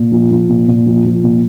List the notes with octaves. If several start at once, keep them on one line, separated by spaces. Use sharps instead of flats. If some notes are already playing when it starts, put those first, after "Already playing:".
Already playing: A#2
F3
F3
A#2
A#2
F3
F3
A#2